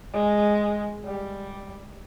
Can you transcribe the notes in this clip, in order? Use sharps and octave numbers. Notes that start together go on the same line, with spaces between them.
G#3
G3